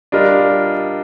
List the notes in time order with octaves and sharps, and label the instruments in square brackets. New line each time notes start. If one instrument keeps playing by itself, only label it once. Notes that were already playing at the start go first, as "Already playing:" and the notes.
[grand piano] G3 D4 F4 A#4 D#5